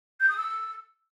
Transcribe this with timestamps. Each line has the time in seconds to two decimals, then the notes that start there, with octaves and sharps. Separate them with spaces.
0.20 G6
0.28 D#6
0.37 E6